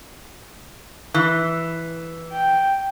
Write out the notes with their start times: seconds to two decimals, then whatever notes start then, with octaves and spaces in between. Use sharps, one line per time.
1.14 E3
2.32 G5